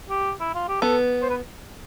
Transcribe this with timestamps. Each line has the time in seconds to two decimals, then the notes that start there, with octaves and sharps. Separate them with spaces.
0.10 G4
0.41 E4
0.55 F4
0.68 G4
0.82 B3 A4
1.22 C5
1.30 B4